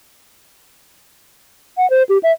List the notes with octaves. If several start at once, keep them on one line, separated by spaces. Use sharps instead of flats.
F#5
C5
G4
E5